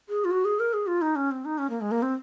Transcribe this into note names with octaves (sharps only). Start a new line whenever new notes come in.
G#4
F4
F#4
G#4
A#4
G#4
F4
D#4
C#4
C4
D#4
C#4
A#3
G#3
A#3
C4